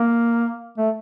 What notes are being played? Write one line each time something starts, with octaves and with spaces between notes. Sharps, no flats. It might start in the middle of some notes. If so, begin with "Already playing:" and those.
Already playing: A#3
A3